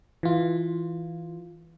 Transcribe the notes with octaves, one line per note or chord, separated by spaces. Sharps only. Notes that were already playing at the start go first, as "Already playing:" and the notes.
E3 F4